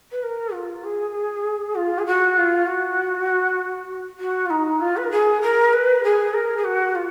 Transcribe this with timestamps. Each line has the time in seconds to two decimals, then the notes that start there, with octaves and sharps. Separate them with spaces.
0.11 B4
0.23 A#4
0.53 F4
0.84 G#4
1.75 F4
1.98 G#4
2.06 F#4
2.37 F4
2.66 F#4
4.19 F#4
4.45 F4
4.50 D#4
4.80 F4
4.96 B4
5.03 A#4
5.11 G#4
5.41 A#4
5.73 B4
6.03 G#4
6.33 A#4
6.57 G#4
6.64 F#4
6.95 F4